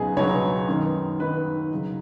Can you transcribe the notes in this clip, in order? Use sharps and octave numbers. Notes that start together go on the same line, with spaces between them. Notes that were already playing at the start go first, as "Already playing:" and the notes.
Already playing: C#2 B2 F#3 B3 D#4 G#4
C#2 B2 F#3 B3 D#4 C#5
F#2 D#3 B3 D#4
F#2 D#3 B3 D#4 B4
C#3 F#3 D#4